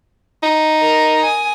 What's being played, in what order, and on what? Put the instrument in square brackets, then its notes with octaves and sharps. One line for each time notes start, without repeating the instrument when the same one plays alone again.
[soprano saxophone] D#4
[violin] A#4
G#5 D#6